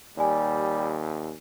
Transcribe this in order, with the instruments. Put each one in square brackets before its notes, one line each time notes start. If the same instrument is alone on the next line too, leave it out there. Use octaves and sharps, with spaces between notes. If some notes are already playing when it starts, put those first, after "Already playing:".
[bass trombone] D#2 [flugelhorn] G3 [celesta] D5 G#5